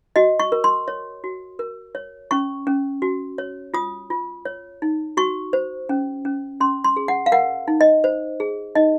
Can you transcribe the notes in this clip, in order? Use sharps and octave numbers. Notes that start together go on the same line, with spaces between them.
F#4 D#5
C#6
A#4
C6
C#5
F#4
A#4
C#5
C#4 C#6
C#4
F#4
C#5
F4 D#6
F4
C#5
D#4
F#4 C#6
C5
C#4
C#4
C#4 C6
C6
G#4
F#5
F5
A#4 F#5
D#4
D#5
C5
G#4
D#4 D#5